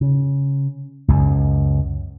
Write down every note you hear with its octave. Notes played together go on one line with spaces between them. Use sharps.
C#3
C#2 F#2